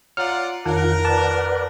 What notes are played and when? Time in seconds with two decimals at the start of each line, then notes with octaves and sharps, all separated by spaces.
0.17 F4 C#5 D5 F5 F#5 A#5 F6
0.66 F2 D#3 F4 A#4 C#5 F#5
1.05 B4 D5 F#5 A5